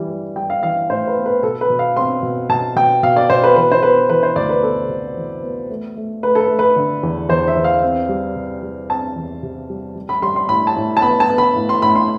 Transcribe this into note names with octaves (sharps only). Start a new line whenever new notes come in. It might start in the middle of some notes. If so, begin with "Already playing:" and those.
Already playing: E3 G3
G3
G3 G5
F5
E3 F5
A2 C5
B4
B3
B4
B2 A4
B4
B2
F5
C4 C6
B2
B2 A5
B2 G5
B2 F5
D5
B2 C5
B4
E3 B4
C5
B3 B4
E3 B4
C5
D2 D5
B4
B3 A4
C3
E3
B3
A3
A3
A3 B4
A4
B4
A3
B4
D3
E2
E2 C5
E5
E2
F5
C4
G3
C3
G3
C4 A5
E2
C3
G3
G3
B5
G3 C6
C6
A2 B5
A5
A2
A5
B3 B5
A5
B3
B5
A2
C6
A2 B5
C6